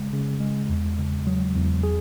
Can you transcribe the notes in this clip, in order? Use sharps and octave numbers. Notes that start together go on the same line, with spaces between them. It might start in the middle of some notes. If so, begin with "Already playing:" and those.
Already playing: C#3 G#3
C#3
G#3
E2
C#3
F#3
E2
G#4